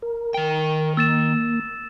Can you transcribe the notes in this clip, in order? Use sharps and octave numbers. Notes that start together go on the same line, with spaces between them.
A#4
D#3 G5
A#3 E6 A6 E7